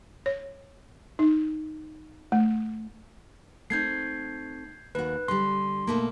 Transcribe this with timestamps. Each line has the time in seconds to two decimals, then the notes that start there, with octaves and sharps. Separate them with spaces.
0.26 C#5
1.19 D#4
2.32 A3
3.70 A3 C4 D#4 G6 G#6 C7
4.95 D#2 F#4 B4
5.28 D3 G3 C6
5.87 B2 A3 A#3